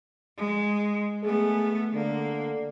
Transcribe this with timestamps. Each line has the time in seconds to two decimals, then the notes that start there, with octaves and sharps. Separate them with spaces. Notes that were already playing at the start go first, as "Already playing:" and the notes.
0.38 G#3
1.23 A3 B3 G#4
1.93 D3 A#3